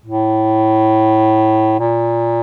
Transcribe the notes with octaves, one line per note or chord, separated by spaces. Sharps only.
A2
A#2